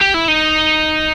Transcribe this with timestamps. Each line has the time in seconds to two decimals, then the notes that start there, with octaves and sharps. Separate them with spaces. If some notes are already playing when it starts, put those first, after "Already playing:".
0.01 G4
0.14 E4
0.28 D#4